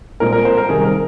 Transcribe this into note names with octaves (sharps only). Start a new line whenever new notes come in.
A#2 F3 G#3 C4 A#4
A#4
C5
A#4
C3 D#3 G3 C4 G#4
A#4